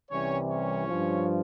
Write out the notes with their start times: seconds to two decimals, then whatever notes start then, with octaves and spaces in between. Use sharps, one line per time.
0.11 C2 C3 E3 G3 C#4 C#5
0.50 C#4 C#5
0.87 G2 F3